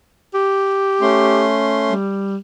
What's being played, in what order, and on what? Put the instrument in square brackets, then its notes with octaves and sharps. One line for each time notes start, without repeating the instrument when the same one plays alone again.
[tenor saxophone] G4
[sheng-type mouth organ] A3 C#4 C6
[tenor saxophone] G3